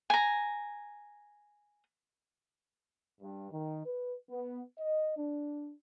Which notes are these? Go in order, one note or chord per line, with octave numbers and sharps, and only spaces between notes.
G#5 A#5
G2
D#3
B4
B3
D#5
D4